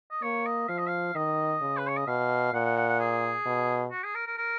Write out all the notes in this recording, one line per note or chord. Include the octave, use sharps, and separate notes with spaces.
D#5
A#3 C#5
D#5
F3 F5
D#5
F5
D#3 D#5
C#3
B4
C#5
D#5
B2 F5
A#2 F#5
F#5
F#5
F#5
G#4
B2
F#4
G#4
A#4
A#4
A#4